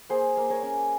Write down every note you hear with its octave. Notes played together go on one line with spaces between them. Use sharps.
A#3 G#4 C5
A#3
A#4 C#5
C#4